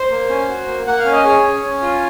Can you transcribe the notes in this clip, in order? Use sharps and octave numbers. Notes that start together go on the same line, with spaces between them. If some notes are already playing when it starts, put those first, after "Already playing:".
Already playing: C5
A#3
C#4
F#4
A#3
A#3 F#5
F5
C#4
D#5
G#4 C#5
C#4
C#4
F4